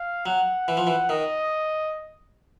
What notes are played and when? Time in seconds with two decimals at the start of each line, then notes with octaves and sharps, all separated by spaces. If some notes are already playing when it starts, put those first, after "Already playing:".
Already playing: F5
0.26 F#3 F#5
0.68 E3
0.77 F3
0.87 E3
1.09 D#3 D#5